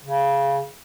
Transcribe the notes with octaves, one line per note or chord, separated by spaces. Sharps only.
C#3